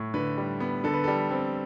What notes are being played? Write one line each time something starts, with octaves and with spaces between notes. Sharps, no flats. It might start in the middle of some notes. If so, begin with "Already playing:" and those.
Already playing: A2
D3 B4
G3
B3
D3 A4
B4
G3 A4
C4